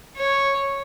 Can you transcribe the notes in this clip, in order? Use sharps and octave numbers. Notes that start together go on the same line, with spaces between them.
C#5